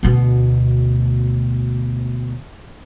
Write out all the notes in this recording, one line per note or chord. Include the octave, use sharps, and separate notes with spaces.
D2 B2